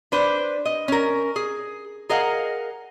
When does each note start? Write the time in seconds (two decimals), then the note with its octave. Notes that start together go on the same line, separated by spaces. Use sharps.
0.12 D4 B4 C5
0.65 D#5
0.88 C#4 A#4
1.36 G#4
2.09 G#4 A#4 D#5 F5 F#5